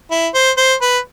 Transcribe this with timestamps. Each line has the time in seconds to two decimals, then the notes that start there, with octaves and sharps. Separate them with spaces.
0.11 E4
0.34 C5
0.57 C5
0.81 B4